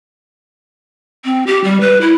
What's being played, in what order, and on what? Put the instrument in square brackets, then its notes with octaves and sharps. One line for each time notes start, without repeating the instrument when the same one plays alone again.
[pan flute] C4
G4
G3
B4
E4